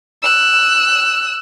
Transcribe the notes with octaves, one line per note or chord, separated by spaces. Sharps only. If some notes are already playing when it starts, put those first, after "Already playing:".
E6 F#6